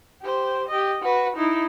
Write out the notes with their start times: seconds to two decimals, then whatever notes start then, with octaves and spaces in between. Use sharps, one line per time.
0.22 G4 C5
0.69 G4 D#5
1.02 F#4 B4
1.37 D#4 E4